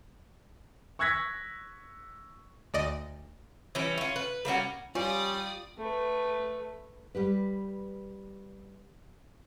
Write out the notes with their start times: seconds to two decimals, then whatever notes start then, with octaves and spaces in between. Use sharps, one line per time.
0.99 C#6 E6 F#6 G#6 A#6 B6
2.74 D2 D5 D#5
3.75 E3 G3 C#4 E4
3.98 C#4 F4
4.16 B4
4.45 G3 A#3 C#4 F#4
4.95 G3 C#4 F4 D5 D#6
5.78 A3 B4
7.15 G3 G4 B4